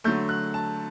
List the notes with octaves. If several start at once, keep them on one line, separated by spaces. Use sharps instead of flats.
D3 F#3 A3 G6
F#6
A5